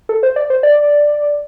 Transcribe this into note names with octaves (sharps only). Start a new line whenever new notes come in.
A4
C5
D5
C5
D5